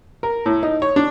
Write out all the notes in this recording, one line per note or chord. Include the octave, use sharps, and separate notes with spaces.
A#4
A2
D#4
C#5
D4